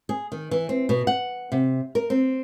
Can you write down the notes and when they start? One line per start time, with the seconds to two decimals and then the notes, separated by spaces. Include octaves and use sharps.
0.09 G#4
0.32 D#3
0.51 E3
0.69 C4
0.89 B2
1.07 F#5
1.52 C3
1.95 A#4
2.10 C4